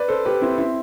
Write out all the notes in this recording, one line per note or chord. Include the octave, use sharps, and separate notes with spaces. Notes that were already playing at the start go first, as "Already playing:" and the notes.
Already playing: B4 D5
A4 C5
G4 B4
C4 E4
C4 E4